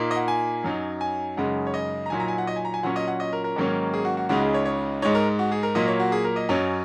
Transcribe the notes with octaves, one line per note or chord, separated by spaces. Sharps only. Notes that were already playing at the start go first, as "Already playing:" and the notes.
Already playing: A#2 A#3 D#4
D#5
F#5
G#5
F#2 F#3 D#4
G#5
F#2 C#3 G#3 D#4 F#5
C#5
D#5
A#5
A#2 F#3 D#4 G#5
A#5
G#5
F#5
D#5
G#5
A#5
G#5
A#2 F#3 C#4 F#5
D#5
F#5
D#5
A#4
A#4
G#2 D#3 F#3 A#3 C#4
G#4
F#4
F#4
C#2 C#3 G#3 D#4 F#4
G#4
C#5
C#5
G#2 G#3 D#4 C#5
A#4
F#4
G#4
A#4
A#2 F#3 A#3 D#5
C#5
F#4
G#4
A#4
D#5
F#2 F#3 C#4